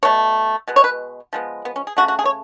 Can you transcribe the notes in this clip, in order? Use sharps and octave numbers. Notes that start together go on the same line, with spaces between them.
B2 A3 C#5
B2 G#3 B3
C#5
B4
F3 G#3 B3
B3
C#4
G#4
C#3 F3 A3 F#4
F#4
G#4
C#5